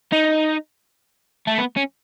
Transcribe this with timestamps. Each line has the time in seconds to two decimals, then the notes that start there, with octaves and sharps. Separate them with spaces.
0.12 D#4
1.47 A3
1.58 B3
1.76 C#4